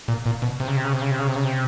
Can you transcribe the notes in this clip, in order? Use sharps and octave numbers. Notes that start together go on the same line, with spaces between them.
A#2
A#2
B2
C3
C#3
C3
C#3
C3
C#3
C3
C#3
C3
C#3
C3